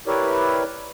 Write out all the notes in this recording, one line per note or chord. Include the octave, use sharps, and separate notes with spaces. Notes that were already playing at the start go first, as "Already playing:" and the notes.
E4 G4 A#4 B4 C#5 D5